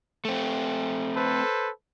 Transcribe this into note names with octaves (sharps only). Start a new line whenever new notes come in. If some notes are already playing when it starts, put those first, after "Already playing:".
A3 C4
A4 B4 C5